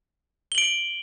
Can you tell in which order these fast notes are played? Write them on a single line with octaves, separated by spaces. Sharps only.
G7 F#7 D7